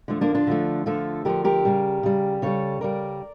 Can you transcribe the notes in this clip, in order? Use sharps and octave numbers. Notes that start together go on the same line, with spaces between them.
D3 F3 A3
A#3 D4
D4 F4
D3 F3 A3
D3 F3 A3 F4 A4
D3 F3 A3 G4 A#4
G4 A#4
C#3 G3
C#3 G3
C#3 G3 A4 C#5
C#3 G3 A#4 D5